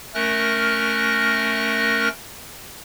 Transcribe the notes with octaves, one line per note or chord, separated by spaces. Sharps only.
A3 C#4 A#4 F6 F#6 A#6